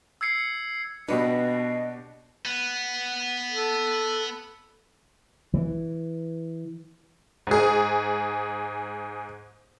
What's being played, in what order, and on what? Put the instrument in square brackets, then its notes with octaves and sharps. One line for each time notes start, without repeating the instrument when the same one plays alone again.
[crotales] E6 G#6 C7 C#7
[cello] B2 [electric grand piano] D4 F#4 G4 [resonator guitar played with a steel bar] B4 [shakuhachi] D#5
[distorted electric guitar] B3
[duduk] A4
[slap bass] E3
[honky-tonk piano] G#2 G#4